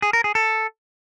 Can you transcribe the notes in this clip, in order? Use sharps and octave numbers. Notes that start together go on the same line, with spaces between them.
G#4
A#4
G#4
A4